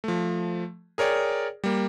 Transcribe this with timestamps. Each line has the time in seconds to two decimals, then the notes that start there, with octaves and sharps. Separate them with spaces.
0.04 F3 A3
0.98 G#4 A#4 C#5 D5 G5
1.64 G3 A#3